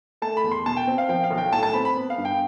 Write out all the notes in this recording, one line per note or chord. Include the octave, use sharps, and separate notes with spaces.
A3 A5
B5
E2
C6
B2 A5
G5
C4
F5
F3 G5
F5
B1
G5
A2 A5
A5
C4 B5
B5
B3
F5
G2
G5